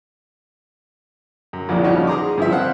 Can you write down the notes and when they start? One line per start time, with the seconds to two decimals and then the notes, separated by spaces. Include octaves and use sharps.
1.53 F#2
1.69 A#1 F2 A#2
1.84 F3 G3 C#4 D#4 F#4
2.07 G#4 A#5 C6 D6
2.38 G2 F3 E5
2.51 C4 C5 F5 F#5